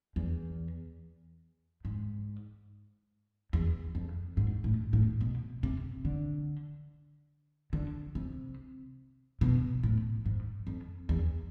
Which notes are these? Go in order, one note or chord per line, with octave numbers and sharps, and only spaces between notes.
E2
G#2
E2
F2
G#2
A2
A2
B2
C3
D3
D3
C3
B2
A2
G#2
F2
E2